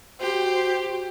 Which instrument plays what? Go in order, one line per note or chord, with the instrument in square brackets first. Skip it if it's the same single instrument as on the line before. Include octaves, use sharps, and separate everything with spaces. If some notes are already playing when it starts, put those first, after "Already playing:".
[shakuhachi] F#4 [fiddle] G4 [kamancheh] C5